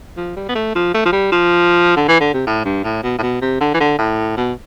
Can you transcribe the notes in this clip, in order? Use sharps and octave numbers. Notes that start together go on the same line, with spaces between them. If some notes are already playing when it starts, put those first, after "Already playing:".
F3
G3
B3
A3
F3
A3
F3
G3
F3
D3
E3
D3
C3
A2
G2
A2
B2
A2
B2
C3
D3
E3
D3
A2
B2